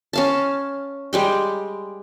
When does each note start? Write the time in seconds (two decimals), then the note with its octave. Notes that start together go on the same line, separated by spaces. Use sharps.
0.13 C#4 F5 A5
1.13 G3 G#3 G5